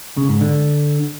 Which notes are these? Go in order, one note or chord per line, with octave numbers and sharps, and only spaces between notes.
C#3
G#2
D3